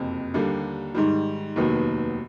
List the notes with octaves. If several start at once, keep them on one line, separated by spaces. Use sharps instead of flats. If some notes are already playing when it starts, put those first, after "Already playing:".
Already playing: F#1 F2 C3
D#2 D3 G3 A#3
G#2 D#3 G3
F1 D#2 D#3 F#3 B3